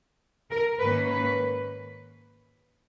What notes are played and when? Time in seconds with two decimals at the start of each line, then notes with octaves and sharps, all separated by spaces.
0.51 A#4
0.80 G#2 D#3 A#3 C#4 B4
1.10 B4